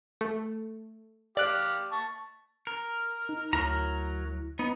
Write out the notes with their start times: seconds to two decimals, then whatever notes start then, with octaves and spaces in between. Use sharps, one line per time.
0.21 A3
1.37 G4 D5 F5 F#6
1.92 A5 C#6
2.67 A#4
3.29 D#4
3.53 D2 F#3 E4 A#4 A#5 A#6
4.59 B3 D#4